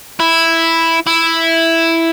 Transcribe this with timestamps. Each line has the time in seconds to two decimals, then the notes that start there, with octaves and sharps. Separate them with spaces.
0.20 E4
1.07 E4